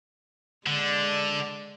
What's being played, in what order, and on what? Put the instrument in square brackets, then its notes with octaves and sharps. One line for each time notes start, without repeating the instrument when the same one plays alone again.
[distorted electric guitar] D3 [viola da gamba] G#3 D5